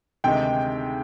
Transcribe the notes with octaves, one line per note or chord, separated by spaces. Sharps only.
D2 C3 D#3 G#3 G5